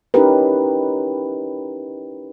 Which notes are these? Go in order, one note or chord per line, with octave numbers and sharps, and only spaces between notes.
C#4 D#4 E4 G4 A#4 B4